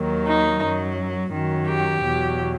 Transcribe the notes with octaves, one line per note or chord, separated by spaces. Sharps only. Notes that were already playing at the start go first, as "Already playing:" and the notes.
Already playing: D#2 D#3 F#3
D#4
F#2 F#3
F#2 D#3 F#3
G4
E2 B2 F#3